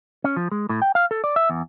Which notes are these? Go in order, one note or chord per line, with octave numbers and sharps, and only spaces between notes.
C#4
F3
G#3
A2
G5
F5
A4
D5
E5
E2